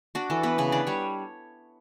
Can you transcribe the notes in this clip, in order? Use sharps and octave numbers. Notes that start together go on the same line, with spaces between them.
D4 F#4
E3 A4
B3 B4
C#3 B4
D4 D5
G3 C#5